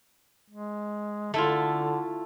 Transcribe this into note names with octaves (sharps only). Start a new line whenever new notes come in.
G#3
D3 A3 E4 F4